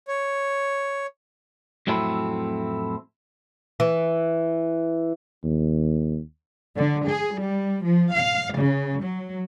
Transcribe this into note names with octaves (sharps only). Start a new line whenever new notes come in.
C#5
F2 A2 F#3 A3 C4 E4
E3
D#2
D3
G#4
G3
F3
F5
C#3
F#3